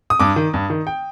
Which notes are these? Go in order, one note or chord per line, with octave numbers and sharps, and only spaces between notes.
D#6
G2 D6
D#3
G2
D#3
G5